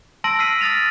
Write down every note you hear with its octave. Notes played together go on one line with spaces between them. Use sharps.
A5 C6 E6 A#6 D7 F#7
E6 F6 B6 C7 D#7
D#6 F6 A6 A#6 F7